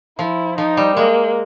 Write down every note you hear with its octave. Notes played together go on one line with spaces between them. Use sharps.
F3 E4
F3 D#4
G3
G#3 A#3